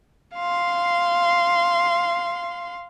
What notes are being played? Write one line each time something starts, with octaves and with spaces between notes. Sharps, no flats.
F5 C6